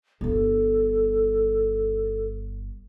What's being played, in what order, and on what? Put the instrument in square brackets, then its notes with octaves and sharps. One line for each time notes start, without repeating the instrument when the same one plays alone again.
[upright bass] G1 F4 [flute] A4